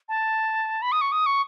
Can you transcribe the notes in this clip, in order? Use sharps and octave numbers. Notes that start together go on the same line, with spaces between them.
A5
B5
D#6
C#6
D#6
C#6